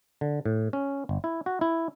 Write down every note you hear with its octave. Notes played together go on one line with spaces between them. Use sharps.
D3
A2
C#4
G1
E4
F#4
E4